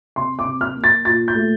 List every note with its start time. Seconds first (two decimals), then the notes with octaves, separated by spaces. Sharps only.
0.16 C3 C6
0.39 D6
0.45 C3
0.61 F6
0.75 A#3
0.84 A6
1.05 A#2 A6
1.28 G6
1.35 A3